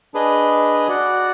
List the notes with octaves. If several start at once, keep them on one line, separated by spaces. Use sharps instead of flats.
D4 G#4 B4 D#5
F#4 D5 F#5